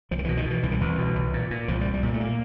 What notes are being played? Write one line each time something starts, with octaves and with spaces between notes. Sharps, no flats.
C2 F3
D#3
B2 E3
D#3
B2 E3
C2 E3
D#3
C2 E3
B2
C2
A#2
A#2
C2 F3
G3
C2
G3
A#2 F#3
A3
A#3